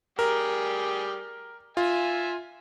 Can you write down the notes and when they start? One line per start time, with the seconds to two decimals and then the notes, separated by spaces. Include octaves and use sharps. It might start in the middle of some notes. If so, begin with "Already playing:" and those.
0.19 G3 G4 G#4 A#4
1.77 F4 E5 G#5